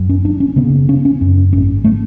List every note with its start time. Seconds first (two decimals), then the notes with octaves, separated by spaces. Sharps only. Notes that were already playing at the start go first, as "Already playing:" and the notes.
Already playing: F#2
0.09 C#4
0.24 F#1 D4
0.40 C#4
0.56 C#3 B3
0.88 C#3 C#4
1.05 C#4
1.21 F#2 C#4
1.53 G#1 C#4
1.84 A3